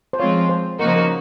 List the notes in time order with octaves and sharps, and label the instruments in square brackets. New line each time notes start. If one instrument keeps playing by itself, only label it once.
[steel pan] C5
[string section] F3 G#3 C4 F4 [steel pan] C#5
[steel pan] C5
[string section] C#3 F3 A#3 D#4 F#4 [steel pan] A#4
[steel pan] C5
A#4